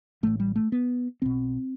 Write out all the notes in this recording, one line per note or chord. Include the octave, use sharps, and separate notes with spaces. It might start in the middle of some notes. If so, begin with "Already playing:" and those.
A1 A2 A3
G3
A3
B3
B1 B2 C4